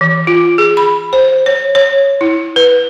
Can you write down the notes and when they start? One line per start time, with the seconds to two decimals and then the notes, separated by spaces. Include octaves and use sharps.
0.01 E3
0.27 F4
0.58 G#4
0.77 B5
1.13 C5
1.46 C#5
1.75 C#5
2.21 E4
2.56 B4